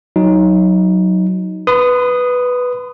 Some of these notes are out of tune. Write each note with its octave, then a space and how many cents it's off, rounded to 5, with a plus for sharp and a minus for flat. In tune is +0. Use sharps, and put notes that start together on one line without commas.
F#3 +0 D#4 +10
B4 +0 C6 -45 D#6 -5